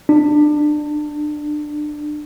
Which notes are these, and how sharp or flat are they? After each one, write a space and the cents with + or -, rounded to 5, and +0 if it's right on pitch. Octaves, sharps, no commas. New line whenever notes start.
D4 +25